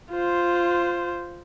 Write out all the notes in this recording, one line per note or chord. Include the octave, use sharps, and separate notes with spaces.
F4 C5